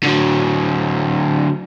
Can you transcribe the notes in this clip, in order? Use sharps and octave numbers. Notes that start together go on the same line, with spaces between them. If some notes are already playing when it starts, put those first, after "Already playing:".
D3 F#3